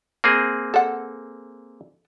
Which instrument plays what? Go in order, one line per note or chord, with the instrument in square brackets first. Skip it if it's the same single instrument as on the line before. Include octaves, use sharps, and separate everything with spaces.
[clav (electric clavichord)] A#3 C4 G#4
[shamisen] A4 F#5